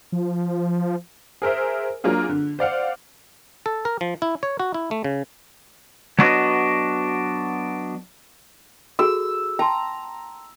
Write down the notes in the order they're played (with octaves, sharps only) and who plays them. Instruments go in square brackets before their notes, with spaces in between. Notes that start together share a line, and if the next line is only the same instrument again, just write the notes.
[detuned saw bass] F3
[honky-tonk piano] G#4 A#4 C5 E5
F#3 A#3 D4 F4 G#4
D3
C5 D5 F5 F#5
[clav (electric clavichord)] A4
A#4
F3
E4
C#5
F#4
E4
A3
C#3
[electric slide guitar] F#3 B3 D4 F#4 B4 D#5
[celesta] F#4 G#4 A4 [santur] E6
[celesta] G5 A5 C6 [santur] A#5